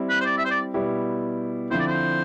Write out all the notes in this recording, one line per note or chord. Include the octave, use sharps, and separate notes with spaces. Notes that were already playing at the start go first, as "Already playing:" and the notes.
Already playing: G3 C4 E4
B4
C5
D5
E5
C5
D5
B2 G3 B3 E4 G4
D3 F3 C4 E4 C5
D5
C5